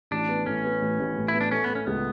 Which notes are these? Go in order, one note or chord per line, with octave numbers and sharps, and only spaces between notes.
A1 D4
B3
A2 C#4
B3
A1
A1
A2
E4
B3
D4
A3 C#4
B3
A3
C#4
C#2 B3